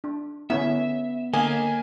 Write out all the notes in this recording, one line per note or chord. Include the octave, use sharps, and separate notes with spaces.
D4
D3 B3 C#4 E4 E5
D3 A#3 D#5 F5 G#5